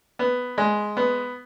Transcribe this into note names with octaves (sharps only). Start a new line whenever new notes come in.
B3
G#3
B3